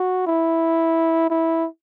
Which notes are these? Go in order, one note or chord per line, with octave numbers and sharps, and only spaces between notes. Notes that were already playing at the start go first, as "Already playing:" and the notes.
Already playing: F#4
E4
E4